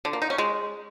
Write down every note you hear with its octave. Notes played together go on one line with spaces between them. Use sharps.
D3
A#3
D#4
C#4
G#3